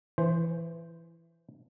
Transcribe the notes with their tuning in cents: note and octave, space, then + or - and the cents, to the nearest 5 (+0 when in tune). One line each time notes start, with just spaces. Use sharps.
E3 +15 C5 +0